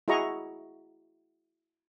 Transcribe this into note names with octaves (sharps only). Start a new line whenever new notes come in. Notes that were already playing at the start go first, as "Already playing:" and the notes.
E4 F#4 G#4 D#5 A#5 C#6